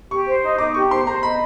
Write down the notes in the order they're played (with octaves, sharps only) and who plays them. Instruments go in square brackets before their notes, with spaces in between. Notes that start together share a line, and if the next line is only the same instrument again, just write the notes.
[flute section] G4 [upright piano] C#6
[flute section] C5
D#4
[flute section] D#4 [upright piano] D6
[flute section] G4 [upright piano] C#6
[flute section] C5 [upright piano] C6
[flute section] C5 [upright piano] A#5
[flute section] D#5 [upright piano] B5